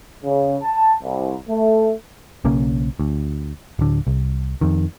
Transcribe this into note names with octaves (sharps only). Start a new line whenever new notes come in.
C#3
A5
C2
A3
B1 C#3 A#3 C#4
D2
D1 D3
C2
F2 D#3